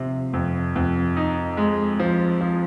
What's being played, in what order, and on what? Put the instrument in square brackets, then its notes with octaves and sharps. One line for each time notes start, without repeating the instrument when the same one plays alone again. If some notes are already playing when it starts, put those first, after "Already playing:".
Already playing: [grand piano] C3 F3
F2
F2
D#4
G#3
F3
F3